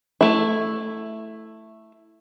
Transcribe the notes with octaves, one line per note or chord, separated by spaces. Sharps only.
A3 E4